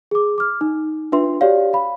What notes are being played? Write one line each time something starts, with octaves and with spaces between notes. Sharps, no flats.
G#4 D6
D6 F6
D#4
D4 F4 B4 E5 C6
F#4 G4 C#5 D5 F5
F5 B5